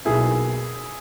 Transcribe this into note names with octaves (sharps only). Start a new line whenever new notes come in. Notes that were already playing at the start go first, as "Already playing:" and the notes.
B1 B2 A#3 E4 G#4